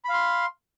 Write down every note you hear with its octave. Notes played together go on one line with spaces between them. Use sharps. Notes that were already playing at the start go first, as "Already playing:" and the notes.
F5 B5 C6